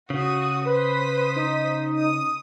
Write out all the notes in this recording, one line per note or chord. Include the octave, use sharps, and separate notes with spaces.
C#3 F#4 D#6
B4 C5 D#6 B6
D#4
D#6